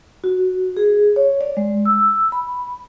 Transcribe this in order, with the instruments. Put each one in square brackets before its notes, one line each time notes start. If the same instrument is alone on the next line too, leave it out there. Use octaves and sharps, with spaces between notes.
[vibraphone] F#4
G#4
C#5
D5
G#3
E6
B5